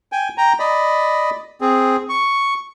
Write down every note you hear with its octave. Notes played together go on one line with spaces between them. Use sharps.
G5 G#5
G5 A#5
D5 D#5 B5
C4 G#4
C#6